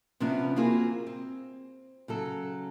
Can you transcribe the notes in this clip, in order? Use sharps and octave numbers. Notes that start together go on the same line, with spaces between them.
C3 F3 B3 C#4 D4
A#3 C4 F4 F#4 G#4
C4
C#3 F#3 A4